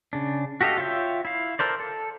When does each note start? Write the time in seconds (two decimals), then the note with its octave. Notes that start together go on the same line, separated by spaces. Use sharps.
0.13 C#3 D4
0.61 F#4 G4 A4 D#5 F5
0.78 F4 C#5 E5 G5
1.25 E4 F5
1.59 A4 A#4 C5 D5
1.80 A4